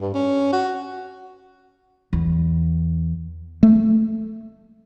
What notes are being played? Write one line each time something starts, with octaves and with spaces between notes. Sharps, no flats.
G2
C#4
F#4
E2
A3